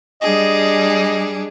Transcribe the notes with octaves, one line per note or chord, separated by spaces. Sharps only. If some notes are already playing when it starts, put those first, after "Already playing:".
G3 D4 G#4 D#5